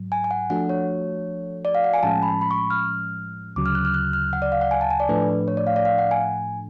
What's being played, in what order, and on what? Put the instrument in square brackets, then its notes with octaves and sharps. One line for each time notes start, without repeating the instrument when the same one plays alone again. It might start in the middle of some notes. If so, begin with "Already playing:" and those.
Already playing: [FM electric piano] G#2 F#3
[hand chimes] G#5
G#5
F#5
[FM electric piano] F3 A3 D4 F#4 A4 [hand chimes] F#5
[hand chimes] C#5
D5
F5
F#5
G#5
[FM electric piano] A2 F3 G#3 C#4 [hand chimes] A5
[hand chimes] B5
B5
C#6
F6
[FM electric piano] D2 C#3 F#3 [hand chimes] D6
[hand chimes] F6
F#6
F6
F#6
F6
F#5
D5
F5
F#5
G#5
A5
G#5
D5
[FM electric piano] A2 F3 A3 D4 [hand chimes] B4
[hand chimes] C#5
D5
F5
D5
F5
F#5
G#5